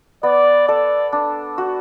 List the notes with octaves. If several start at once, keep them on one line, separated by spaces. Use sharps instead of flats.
B3 D5
A4 D5
D4
F#4